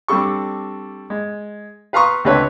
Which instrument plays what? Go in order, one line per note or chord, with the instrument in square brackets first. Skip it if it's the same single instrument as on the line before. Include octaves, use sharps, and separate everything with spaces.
[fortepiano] G3 C4 D4 A4 C#6
G#3
B4 F5 A#5 C6 C#6 D#6
C#2 D3 A3 C4 B4 C#5